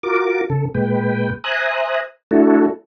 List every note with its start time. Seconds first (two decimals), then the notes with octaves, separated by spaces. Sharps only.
0.03 F4 F#4 A#4 D6
0.50 C#3 A4
0.74 A#2 G#3 B4 G5
1.44 C5 E5 G#5 A#5 D#6 F#6
2.31 A3 D4 E4 F#4 A4